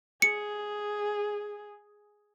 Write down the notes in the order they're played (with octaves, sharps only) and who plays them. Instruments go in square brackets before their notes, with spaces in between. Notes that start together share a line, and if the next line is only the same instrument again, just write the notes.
[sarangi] G#4 [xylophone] C#7